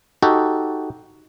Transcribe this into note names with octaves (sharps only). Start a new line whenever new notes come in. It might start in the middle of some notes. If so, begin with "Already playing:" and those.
D#4 F#4 G4 A4